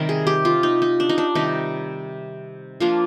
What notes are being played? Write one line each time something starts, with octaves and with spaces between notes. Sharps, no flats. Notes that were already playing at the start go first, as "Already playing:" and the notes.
Already playing: C3 D#3 G3 A#4 C5
G#4
G4
F4
D#4
D#4
D4
D#4
D4
C3 D#3 G3 D#4
F3 A#3 D4 F4